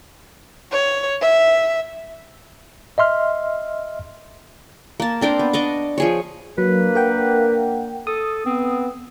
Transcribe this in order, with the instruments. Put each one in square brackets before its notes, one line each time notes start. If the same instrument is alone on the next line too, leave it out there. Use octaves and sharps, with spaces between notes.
[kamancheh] C#5
E5
[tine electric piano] D#5 E5 C6 F6
[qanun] A#3 A5
C4 D4 A#4 C5
B3
D4 D#5 C#6 D6
F3 G#4 C#5
[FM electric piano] F#3 [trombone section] A#3 D4 [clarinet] B4
[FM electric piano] A#4 F#5 G5
[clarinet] A4 [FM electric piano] D#6
[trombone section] B3 [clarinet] C4